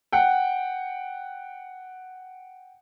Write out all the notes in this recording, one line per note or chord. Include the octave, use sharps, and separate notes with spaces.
F#5 G5